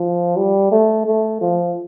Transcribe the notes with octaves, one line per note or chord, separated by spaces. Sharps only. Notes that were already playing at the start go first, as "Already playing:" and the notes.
Already playing: F3
G3
A3
A3
F3